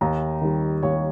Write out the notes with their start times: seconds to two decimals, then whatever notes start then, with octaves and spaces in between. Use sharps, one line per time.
0.01 D#2 A#5
0.41 D#3 G3
0.83 D#2 C#5